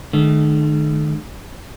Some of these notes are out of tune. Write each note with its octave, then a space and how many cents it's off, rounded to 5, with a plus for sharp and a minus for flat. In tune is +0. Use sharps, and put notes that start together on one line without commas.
D#3 -40 A3 -40